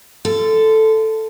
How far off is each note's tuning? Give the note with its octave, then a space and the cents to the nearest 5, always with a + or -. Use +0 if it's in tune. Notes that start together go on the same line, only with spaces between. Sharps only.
F4 -35 A4 +0